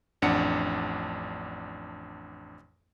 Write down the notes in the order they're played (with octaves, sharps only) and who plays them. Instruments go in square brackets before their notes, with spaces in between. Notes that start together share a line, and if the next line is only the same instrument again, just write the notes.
[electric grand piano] A1 F2 D4 F#5 C#7